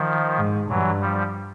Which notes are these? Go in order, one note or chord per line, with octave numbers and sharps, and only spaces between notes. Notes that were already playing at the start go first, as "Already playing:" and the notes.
Already playing: D#3 F3
G#2
G2 E3 F#3
F3 G3